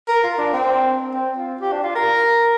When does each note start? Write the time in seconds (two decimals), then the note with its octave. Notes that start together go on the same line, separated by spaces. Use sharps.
0.08 A#4
0.23 F4
0.38 D4
0.53 C4
1.14 C4
1.38 F4
1.61 G4
1.72 D4
1.84 F4
1.95 A#4